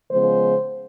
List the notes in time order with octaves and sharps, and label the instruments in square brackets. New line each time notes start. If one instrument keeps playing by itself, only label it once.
[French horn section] C#3 F3 G#3 B3 C5